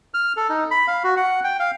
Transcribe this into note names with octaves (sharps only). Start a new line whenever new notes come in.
F6
A4
D#4
B5
F5
F#4
F#5
G5
F5